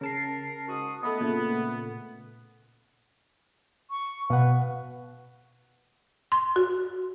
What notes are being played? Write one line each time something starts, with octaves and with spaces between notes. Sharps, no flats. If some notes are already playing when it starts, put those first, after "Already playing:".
C#3 A#4 A5 C7
G#2 F#4 D#6
A3 B3 E4 D#5
A#2 C#3 A3
C#6
B2 B4 F5 F#5
C6
F#4